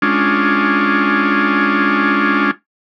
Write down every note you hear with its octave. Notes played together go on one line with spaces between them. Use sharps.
G#3 C#4 D4 F4